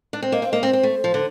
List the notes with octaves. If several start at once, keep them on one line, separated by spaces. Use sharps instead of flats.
D4
C4
A#3 D#5
C4 F5
A#3 D#5
C4 C5
C4
A3
F3
D3